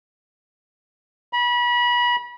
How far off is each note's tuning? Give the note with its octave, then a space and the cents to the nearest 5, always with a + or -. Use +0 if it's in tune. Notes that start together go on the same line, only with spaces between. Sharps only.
B5 -30